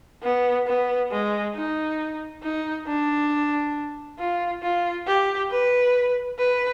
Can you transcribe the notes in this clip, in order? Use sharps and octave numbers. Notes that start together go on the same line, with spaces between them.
B3
B3
G#3
D#4
D#4
D4
F4
F4
G4
B4
B4